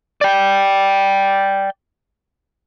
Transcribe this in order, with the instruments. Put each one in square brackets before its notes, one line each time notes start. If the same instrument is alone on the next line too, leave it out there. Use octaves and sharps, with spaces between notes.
[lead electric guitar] D5 G5